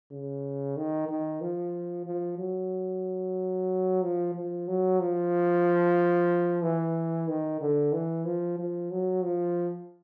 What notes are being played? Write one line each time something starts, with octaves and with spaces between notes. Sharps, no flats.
C#3
D#3
D#3
F3
F3
F#3
F3
F3
F#3
F3
E3
D#3
D3
E3
F3
F3
F#3
F3